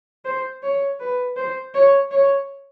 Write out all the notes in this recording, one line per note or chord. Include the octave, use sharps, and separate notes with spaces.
C5
C#5
B4
C5
C#5
C#5